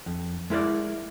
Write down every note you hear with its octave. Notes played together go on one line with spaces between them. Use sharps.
F2
G#3 E4 A#4 D5